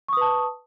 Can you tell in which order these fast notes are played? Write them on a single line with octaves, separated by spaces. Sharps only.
C#6 D#6 B4 A5